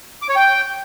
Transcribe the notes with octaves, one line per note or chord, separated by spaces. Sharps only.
D6
C#5
G5